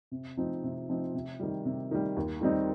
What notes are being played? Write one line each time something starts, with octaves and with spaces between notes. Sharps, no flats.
C3
F3 C4 D#4
C3
F3 C4 D#4
C3
D#3 G3
C3
D#3 G3
D#2
D#3 G3 C4 D#4